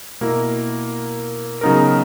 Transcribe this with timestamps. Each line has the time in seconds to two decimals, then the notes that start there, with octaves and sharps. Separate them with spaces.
0.21 B2 A#3 E4 A#4
1.61 C#3 F#3 B3 D#4 A#4